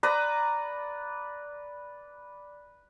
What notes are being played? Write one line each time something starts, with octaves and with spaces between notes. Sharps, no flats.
B4 D5 A#5